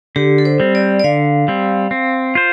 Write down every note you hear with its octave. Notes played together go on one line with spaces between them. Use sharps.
D3 G4
A4
C5
G3 C4
D5
D5
D3 F5
G3 C4
C4
F4 C5